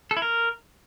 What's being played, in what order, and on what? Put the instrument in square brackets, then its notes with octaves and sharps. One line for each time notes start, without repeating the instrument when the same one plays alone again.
[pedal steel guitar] A4
E4
A#4